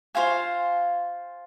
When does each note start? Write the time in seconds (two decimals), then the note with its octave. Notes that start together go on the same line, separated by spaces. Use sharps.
0.15 F4 C5 F5 G#5